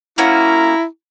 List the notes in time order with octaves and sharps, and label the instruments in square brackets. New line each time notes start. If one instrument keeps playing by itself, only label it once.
[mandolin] A#3 C#4 F#4 [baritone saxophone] E4 [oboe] A#5